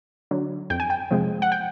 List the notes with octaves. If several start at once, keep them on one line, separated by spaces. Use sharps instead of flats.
D3 F#3
F2 G5
G#5
G5
C3 F3 G#3
F#5
G5